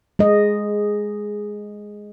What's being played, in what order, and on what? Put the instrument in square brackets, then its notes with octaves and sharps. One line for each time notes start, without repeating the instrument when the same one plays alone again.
[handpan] G#3 D#5